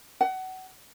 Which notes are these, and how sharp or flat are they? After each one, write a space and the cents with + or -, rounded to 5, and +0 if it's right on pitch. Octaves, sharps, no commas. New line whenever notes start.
F#5 +25